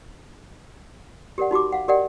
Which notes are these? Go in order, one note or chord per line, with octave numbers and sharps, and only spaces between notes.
G4 A#4 D5 F#5
D#4 F#4 G4 D6
F5 F#5
G4 A#4 D5 D#5 F#5 G5